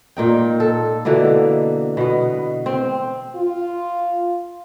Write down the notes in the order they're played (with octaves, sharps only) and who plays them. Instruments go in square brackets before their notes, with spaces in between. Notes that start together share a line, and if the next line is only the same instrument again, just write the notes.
[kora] A#2 D#4 G5
A4
B2 D3 E3 A#3
B2 B3
C4
[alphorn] F4